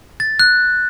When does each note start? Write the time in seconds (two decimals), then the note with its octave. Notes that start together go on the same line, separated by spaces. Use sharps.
0.20 A6
0.39 F#6